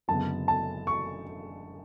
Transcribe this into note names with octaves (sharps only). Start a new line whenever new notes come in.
F#1 F#2 D3 G#3 B3 A5
A5
C#6